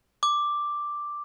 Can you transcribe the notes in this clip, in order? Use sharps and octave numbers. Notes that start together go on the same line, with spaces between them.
D6